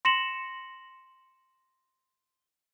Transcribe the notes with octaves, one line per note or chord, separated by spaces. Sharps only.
C6 A#6 C#7 E7 F#7